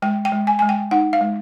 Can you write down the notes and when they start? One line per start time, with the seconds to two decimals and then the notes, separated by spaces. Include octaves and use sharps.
0.02 G#3 G5
0.25 G5
0.32 G#3
0.47 G#5
0.59 G#3 G#5
0.69 G5
0.91 D#4 F#5
1.13 F5
1.21 G#3